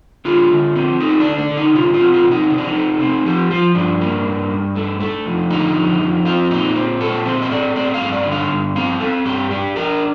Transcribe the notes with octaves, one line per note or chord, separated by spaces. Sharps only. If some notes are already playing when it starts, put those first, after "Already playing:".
D3 F4
D3
C4
A3 D#4
D4
D3
D4
D3
D#4
C3 F4
F4
C4
F4
C3
D#4
C3 D#4
D4
D#4
A3
C4
F3 G4
F3 F4
G2 D4
A#3
G2
G2
A3
A3
F2
D3 D#4
F2
F2
C4 F4
A#2 D#4
C4
A#2 A4
C4 C5
D#5
A3 D5
C4 D5
F5
G2
D5
D3
F5
G2
C4 F5
C4 A4
G2 G4
D4 G4
D4 A#4